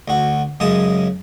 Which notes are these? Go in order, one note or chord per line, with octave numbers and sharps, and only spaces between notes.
D2 F#4
F#2 C#3 G#3 A5 D#6